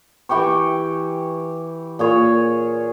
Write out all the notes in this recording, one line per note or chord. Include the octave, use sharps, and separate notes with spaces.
E3 G4 G5 C#6
A#2 G#4 C#5